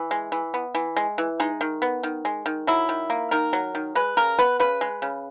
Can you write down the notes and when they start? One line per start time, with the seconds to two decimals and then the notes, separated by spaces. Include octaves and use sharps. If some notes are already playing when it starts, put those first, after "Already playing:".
Already playing: E3
0.11 G#3
0.32 E3
0.54 B3
0.75 E3
0.96 G#3
1.18 E3
1.40 G#3 D#4
1.61 D#3
1.82 B3
2.03 D#3
2.25 G#3
2.46 D#3
2.67 F#3 E4
2.89 D#3
3.10 A#3
3.31 D#3 A#4
3.53 F#3
3.75 D#3
3.95 G#3 B4
4.17 C#3 A#4
4.39 B3 B4
4.60 C#3 B4
4.81 G#3
5.02 C#3